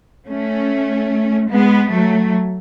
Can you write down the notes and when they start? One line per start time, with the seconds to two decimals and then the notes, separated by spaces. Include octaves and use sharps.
0.29 A3 C#4
1.51 G#3 B3
1.93 F#3 A3